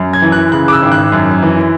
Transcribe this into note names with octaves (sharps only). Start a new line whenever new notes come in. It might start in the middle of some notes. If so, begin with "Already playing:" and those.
Already playing: F#2
G#6
E3
F#6
C#3 F#6
D6
E6
G#1
F#6
F#2
E3